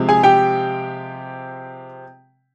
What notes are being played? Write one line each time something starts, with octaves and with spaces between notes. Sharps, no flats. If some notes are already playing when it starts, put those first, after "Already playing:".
Already playing: C3 F3 G#3 C4
G#4 G#5
G4 G5